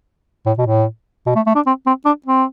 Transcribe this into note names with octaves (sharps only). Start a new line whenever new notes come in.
A2
B2
A2
B2
A3
A3
D4
C4
C4
D4
C4